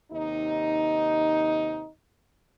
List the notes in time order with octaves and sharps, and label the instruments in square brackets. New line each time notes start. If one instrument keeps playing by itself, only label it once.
[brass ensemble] D#2 C3 D#4